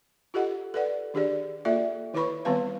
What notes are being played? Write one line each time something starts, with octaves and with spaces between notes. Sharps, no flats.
F4 G4 A4 D#5 F#5
A4 B4 D5 F#5
D#3 D4 G4 G#4 D5
A#3 F4 A4 D5 E5
D#3 E4 B4 C#5 B5 C#6
D#3 G3 B3 C4 B4 F5